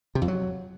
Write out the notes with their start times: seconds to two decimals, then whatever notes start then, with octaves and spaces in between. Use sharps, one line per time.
0.15 C3
0.22 F2
0.28 F#3